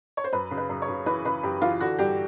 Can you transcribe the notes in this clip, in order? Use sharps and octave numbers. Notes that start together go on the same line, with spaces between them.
C#5
C5
F#2 B4
C#3
B4
F#2
C#5
C#3
E3 B4
C#3 B4
F#2 G4
E3 F4
D3 F#4
G2 G4